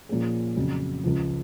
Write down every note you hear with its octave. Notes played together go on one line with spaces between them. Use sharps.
A#2 F3 A#3 C#4 G#4
F2 C#3 F#3
C#2 C#3 F3